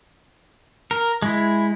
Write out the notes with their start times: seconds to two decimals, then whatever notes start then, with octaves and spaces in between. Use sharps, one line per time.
0.91 A#4
1.22 G#3 E4